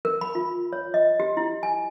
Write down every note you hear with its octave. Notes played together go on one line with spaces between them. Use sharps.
A#4
B5
F4
C#5
D#5
G4
E4
G#5